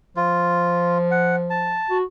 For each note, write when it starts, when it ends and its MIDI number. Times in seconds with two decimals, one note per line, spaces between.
0.17 1.82 53
0.17 0.98 65
1.11 1.36 78
1.50 1.98 81
1.90 2.04 66